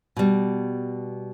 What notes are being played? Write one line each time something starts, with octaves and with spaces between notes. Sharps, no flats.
B2 G3